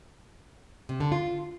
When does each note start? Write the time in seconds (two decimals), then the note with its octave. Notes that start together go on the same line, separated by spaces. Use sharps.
0.89 C3
1.00 D3
1.12 F4